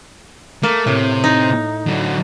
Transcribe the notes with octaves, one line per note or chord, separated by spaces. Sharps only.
A3 A#3
A2 C3
D#4
D3 F#3